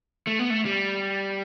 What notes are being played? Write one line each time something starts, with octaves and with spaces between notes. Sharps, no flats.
A3
B3
A3
G3